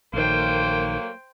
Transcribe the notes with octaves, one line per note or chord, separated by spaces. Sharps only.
A#1 D#3 F#3 A3 A#3 C5 G5